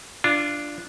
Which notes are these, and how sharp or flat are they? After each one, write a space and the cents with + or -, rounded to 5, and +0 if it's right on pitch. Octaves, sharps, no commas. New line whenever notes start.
D4 +0 F4 -20